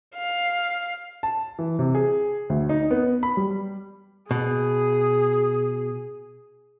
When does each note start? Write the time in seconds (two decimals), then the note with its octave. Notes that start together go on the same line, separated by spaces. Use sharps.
0.16 F5
1.23 A5
1.59 E3
1.79 C3
1.95 G#4
2.50 D2
2.69 D#4
2.91 B3
3.23 B5
3.37 G3
4.31 B2 G#4